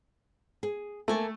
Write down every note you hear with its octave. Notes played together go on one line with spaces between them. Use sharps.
G#4
A3 A#3 G#5 A5